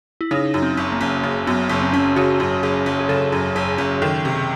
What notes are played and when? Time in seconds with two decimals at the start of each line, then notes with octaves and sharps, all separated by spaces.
0.21 E4
0.31 C#3 D#4
0.54 F#2
0.62 C4
0.77 F#1
0.92 A#3
1.01 F#1
1.23 C#3
1.47 F#2 B3
1.69 F#1
1.81 C4
1.93 F#1 C#4
2.16 C#3 F#4
2.40 F#2
2.63 F#1 G#4
2.86 F#1
3.00 G#4
3.09 C#3 A4
3.32 F#2 G#4
3.55 F#1 G#4
3.78 F#1 G#4
4.02 D#3 A4
4.25 C3 G#4